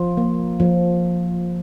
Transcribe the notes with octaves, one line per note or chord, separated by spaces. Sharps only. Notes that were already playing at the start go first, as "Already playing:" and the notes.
Already playing: F3 F4
A#3
F3